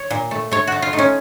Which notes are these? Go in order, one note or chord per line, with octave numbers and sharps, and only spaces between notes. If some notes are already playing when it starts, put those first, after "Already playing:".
Already playing: C#5
A#2
A3
A3 C#5
A3 F#4
F4
A3 D#4
C#4